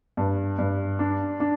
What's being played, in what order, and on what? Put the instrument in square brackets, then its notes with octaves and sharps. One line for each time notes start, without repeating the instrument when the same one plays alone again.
[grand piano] G2
G2
D4
D4